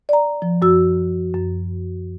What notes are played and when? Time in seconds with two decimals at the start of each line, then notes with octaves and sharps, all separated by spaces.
0.09 D5 A#5
0.42 F3
0.62 F#2 F#4 E6
1.34 F#2